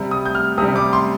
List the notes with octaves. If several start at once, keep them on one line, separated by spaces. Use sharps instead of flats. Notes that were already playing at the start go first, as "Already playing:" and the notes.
Already playing: C3 G3
D#6
G6
F6
C3 G3 D#6
D6
C6